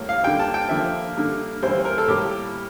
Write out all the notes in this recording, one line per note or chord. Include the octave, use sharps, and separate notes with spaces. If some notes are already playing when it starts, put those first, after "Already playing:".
Already playing: A2 G3 A#3
F5
D3 G3 A#3 G5
A5
G5
D3 F3 A#3 E5
D3 G3 A#3
A2 E3 G3 A#3 C5
A#4
A4
A2 G3 A#3 G4